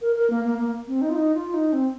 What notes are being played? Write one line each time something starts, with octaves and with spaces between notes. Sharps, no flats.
A#4
A#4
A#3
A#3
A#3
C4
D#4
F4
D#4
F4
D#4
C4